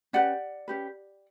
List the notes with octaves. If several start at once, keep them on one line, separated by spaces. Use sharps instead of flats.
C#4 G4 B4 D5 F#5
C#4 G4 B4